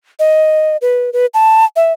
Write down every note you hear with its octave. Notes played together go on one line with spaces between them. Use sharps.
D#5
B4
B4
A5
E5